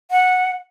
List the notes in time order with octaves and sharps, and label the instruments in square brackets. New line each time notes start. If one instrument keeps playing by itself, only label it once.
[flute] F#5